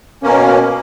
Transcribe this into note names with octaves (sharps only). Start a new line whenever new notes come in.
B2 A#3 C#4